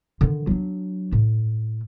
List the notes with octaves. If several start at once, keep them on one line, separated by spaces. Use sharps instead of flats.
D3 D#3
F#3 D4
A2